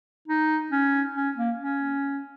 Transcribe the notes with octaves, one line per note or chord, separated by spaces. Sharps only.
D#4
C#4
C#4
A#3
C#4